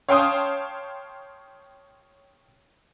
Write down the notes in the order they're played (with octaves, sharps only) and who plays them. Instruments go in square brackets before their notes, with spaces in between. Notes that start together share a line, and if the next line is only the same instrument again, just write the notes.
[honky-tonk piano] C#5 F5 G5 A5 C6 D#6